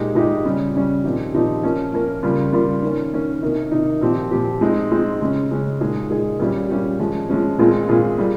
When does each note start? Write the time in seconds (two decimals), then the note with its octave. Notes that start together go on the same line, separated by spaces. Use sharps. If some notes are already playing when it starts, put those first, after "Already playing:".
Already playing: A#2 G#3 D#4 G4
0.15 A#2 G#3 D#4 G4
0.45 C#3 G3 C#4
0.75 C#3 G3 C#4
1.04 A#2 F3 C4 D#4 G4
1.34 A#2 F3 C4 D#4 G4
1.63 F3 A#3 C#4
1.93 F3 A#3 C#4
2.23 C#3 G3 A#3 F4
2.53 C#3 G3 A#3 F4
2.82 D#3 A#3 C#4
3.13 D#3 A#3 C#4
3.42 C3 D#3 A#3 D#4
3.71 C3 D#3 A#3 D#4
4.01 A#2 F3 C4 G4
4.31 A#2 F3 C4 G4
4.61 G#3 C4 D#4
4.91 G#3 C4 D#4
5.21 C#3 G#3 C#4
5.51 C#3 G#3 C#4
5.81 A#2 G#3 D#4 G#4
6.10 A#2 G#3 D#4 G#4
6.39 A#2 G3 C#4 G4
6.69 A#2 G3 C#4 G4
7.00 F3 G#3 C#4
7.29 F3 G#3 C#4
7.59 A#2 G#3 C4 F4 G#4
7.89 A#2 G#3 C4 F4 G#4
8.18 G3 A#3 F4 G#4